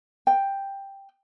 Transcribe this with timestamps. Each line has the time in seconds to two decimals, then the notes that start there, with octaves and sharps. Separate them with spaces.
0.27 G5